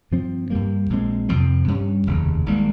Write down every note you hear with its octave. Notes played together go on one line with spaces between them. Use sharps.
G2 F3 C4
G2 G3 A#3
A#1 A#2 G#3 C4
F2 C3 F3 C4
G2 G3 C#4
F1 D#2 C#3
G#1 G#2 G3 A#3